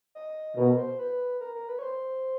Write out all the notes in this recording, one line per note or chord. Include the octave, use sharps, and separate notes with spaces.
D#5
B2 A#4
C5
B4
A#4
A#4
B4
C#5
C5